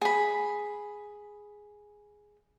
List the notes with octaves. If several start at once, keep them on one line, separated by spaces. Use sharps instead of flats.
G#4 B5